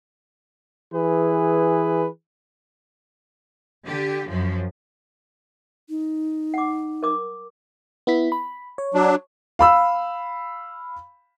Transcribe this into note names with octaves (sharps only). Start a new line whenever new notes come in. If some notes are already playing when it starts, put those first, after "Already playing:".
E3 G#4 B4
D3 G4
F#2 F3
D#4
F#5 D6
A#4 D6 D#6
B3 E4 B6
B5
C#5
F#3 D4
F5 B5 E6